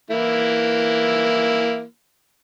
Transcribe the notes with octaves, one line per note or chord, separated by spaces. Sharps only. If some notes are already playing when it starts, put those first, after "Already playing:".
E3 A#3 E4